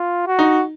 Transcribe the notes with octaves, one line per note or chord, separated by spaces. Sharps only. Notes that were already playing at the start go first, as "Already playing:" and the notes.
Already playing: F4
F#4
D#4